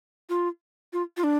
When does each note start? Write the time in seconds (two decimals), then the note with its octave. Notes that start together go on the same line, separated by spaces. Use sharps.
0.29 F4
0.93 F4
1.17 F4
1.24 D4